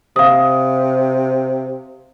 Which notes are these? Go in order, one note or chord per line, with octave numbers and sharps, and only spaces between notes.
C3 F5 D#6